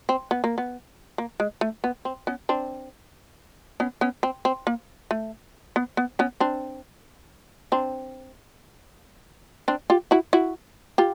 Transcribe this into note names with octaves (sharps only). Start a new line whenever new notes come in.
C4
B3
A#3
B3
A#3
G#3
A3
B3
C4
B3 C#4
C4 D4
B3 C#4
B3 C#4
C4
C4
A#3
A3
B3
B3
B3 C#4
C4 D4
C4 D4
C4 D4
F4 G4
E4 F#4
E4 F#4
F4 G4